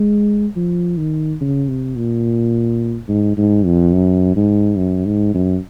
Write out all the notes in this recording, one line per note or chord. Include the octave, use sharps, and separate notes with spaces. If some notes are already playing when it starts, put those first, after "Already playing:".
Already playing: G#3
F3
D#3
C#3
C3
A#2
G#2
G#2
F2
F#2
G#2
F#2
G#2
F#2